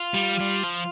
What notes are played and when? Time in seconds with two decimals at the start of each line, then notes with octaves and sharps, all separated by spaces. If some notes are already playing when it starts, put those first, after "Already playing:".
Already playing: F4
0.14 G3
0.40 G3
0.64 F3